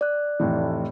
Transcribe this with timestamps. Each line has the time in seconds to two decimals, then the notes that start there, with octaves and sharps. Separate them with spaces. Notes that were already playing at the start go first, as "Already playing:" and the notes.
0.01 D5 F#6
0.40 F1 A2 E3